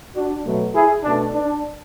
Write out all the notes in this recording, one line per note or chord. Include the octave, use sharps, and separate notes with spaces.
D4 F#4
B2 F#3 A3
E4 G#4
B2 A3 D4
D4